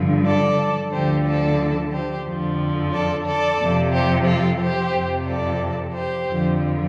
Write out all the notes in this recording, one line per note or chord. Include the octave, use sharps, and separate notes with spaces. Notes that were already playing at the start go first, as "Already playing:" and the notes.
Already playing: G2 D3 F3
A4 D5
D2 D3 F3 G4 C5
A4 D5
G4 C5
F2 D3 F3
A4 D5
A4 D5
F2 C3 F3
G4 C5
F4 A4
G4 C5
F2 C3 F3
A4 D5
G4 C5
F2 D3 F3